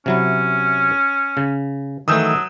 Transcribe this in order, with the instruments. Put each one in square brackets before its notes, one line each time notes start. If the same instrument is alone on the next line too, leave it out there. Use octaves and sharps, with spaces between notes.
[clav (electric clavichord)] C3 F#3 E4 [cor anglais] C#4
[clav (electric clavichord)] C#3
[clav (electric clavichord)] D#3 E3 A3 [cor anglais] F#3 [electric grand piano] D#6 E6 G6